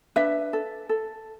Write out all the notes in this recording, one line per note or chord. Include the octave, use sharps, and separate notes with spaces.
D4 B4 E5
A4
A4